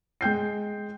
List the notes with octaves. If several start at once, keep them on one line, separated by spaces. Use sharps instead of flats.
G#3 G5 G6 C7